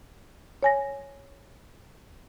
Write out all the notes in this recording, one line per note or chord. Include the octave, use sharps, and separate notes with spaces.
C#5 G#5 A#6